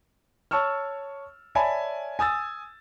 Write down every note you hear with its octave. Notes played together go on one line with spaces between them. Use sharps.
C#5 A5 C#6 E6 F6
C#5 D5 E5 G#5 A5 B5
G#5 D#6 E6 A6